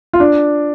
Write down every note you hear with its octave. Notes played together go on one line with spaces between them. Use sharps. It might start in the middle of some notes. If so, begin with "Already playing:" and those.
F4
D4